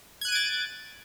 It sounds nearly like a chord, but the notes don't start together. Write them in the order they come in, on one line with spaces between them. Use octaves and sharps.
G#6 F#6 D#7 D7 A6